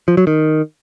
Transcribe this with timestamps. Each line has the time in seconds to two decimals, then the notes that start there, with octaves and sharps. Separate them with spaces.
0.08 F3
0.17 F#3
0.27 D#3